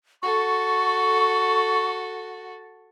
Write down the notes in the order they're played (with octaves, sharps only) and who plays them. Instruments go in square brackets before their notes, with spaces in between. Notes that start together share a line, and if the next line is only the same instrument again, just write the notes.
[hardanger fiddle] F#4 A4 [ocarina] C#6